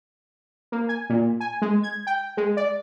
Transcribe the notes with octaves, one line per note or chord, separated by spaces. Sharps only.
A#3
G#5
A#2
G#5
G#3
G#6
G5
G#3
D5